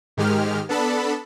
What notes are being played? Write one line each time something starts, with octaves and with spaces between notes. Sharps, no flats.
G#2 D#3 G#3 G4 F6
B3 D4 A4 A5 B5